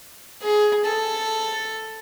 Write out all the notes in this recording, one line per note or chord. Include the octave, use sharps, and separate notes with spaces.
G#4
A4